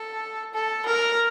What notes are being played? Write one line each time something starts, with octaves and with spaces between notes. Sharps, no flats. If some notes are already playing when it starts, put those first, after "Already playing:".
Already playing: A4
A4
A#4